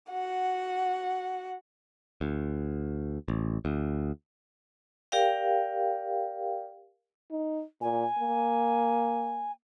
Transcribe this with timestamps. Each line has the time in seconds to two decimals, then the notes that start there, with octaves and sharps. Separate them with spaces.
0.11 F#4 F#5
2.21 D2
3.28 A1
3.65 D2
5.12 G4 A#4 D5 F5 G5
7.31 D#4
7.81 A#2 G#5
8.19 A#3